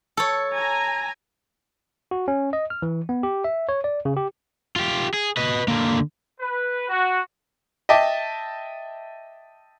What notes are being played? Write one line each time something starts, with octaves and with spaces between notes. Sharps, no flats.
A4 C#5
G#5 A#5
F#4
C#4
D#5
F6
E3
B3
G4
E5
C#5
D5
C#3
G4
F4 G4
G#4
B4 D#5
D3 A#3
B4
F#4
D#5 E5 G5 A5 D6